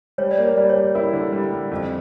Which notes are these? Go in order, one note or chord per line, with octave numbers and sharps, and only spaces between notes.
G3 C#5
D5
A#3
C#5
G3 D5
C#5
G3
E4 A#4
D3
G3
G3
F2